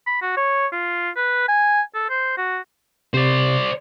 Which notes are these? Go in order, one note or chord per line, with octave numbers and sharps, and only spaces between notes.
B5
F#4
C#5
F4
B4
G#5
A4
C5
F#4
C3 C5 D5